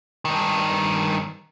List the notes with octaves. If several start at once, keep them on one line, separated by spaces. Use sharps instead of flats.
G2 D#3